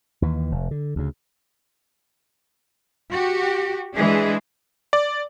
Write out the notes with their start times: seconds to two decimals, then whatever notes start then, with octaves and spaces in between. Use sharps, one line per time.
0.22 D#2 E3
0.52 F1
0.71 D3
0.96 D2 C#3
3.11 F#4 G4
3.95 E3 G#3 D4 G#4
4.93 D5